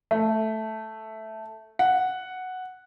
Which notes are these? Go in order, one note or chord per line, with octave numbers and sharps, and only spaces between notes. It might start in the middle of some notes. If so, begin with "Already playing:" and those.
A3
F#5